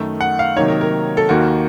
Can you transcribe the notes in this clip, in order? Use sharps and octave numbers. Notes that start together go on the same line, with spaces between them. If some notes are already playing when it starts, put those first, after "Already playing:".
Already playing: F#2 D#3 A3
F#5
F5
C3 D#3 F#3 A#3 D#4 C#5
A#4
A#4
A4
D#2 D#3 A#3 F#4